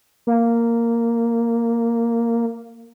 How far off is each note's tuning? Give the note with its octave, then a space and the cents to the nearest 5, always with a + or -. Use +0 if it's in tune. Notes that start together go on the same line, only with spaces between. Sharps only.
A#3 -5